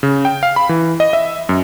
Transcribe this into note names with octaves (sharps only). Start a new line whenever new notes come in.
C#3
G5
F5
B5
E3
D#5
E5
F#2